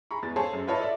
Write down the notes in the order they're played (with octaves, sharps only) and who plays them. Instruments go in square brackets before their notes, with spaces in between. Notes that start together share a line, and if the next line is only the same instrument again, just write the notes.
[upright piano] G#4 A#5 B5 C#6
E2 G#3 A6
G#4 A4 C5 C#5 F5 A5
F#2
E4 F4 B4 C#5 D#5 A5
A4 D5 E5